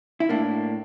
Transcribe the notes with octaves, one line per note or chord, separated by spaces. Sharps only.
E4
A2 A#3 D4